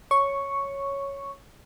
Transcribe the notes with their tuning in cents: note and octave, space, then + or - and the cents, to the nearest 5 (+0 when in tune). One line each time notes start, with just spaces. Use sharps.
C#5 +0 C#6 +0